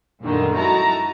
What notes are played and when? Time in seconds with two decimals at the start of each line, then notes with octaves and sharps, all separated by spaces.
0.23 F#2 A#2 D3 D#3 G3 D#4
0.55 D#4 E4 F#4 A5 A#5